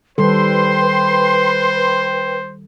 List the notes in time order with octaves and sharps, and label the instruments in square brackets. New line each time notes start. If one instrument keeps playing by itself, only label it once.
[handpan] D#3 G3 A4 [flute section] B4 G5 [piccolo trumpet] C5 [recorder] C6